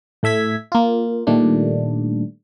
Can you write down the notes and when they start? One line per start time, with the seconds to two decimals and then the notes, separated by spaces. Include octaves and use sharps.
0.23 A2 A3 E5 G#6 B6
0.72 A#3 F4
1.27 A#2 D#3 G3 A3 D4